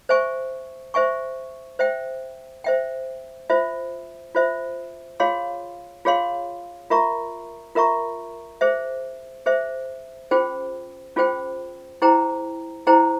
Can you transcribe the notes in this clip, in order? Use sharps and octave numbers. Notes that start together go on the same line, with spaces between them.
C5 E5 G#5 C#6
C5 E5 G#5 C#6
C5 E5 G5
C5 E5 G5
F4 C5 E5
F4 C5 E5
F4 G#4 C#5 F5 C6
F4 G#4 C#5 F5 C6
F4 A#4 E5 A#5 C#6
F4 A#4 E5 A#5 C#6
G#4 C5 E5
G#4 C5 E5
C#4 F4 G#4 C5 G5
C#4 F4 G#4 C5 G5
E4 G#4 C5 G5 A#5
E4 G#4 C5 G5 A#5